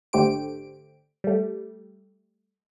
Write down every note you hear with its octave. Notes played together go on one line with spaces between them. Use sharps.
G#1 D3 A3 G4 C5 D7
G3 A3